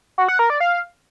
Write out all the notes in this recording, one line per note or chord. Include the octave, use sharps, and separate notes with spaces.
F#4
F#5
A#4
D5
F5